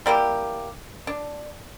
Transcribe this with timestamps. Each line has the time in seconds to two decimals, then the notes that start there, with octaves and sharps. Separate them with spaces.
0.06 G3 A#3 E4 G4
1.07 D4